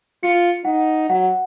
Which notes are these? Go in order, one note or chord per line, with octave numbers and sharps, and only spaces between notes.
F4 C#7
D#4 F#5
F#3 F#5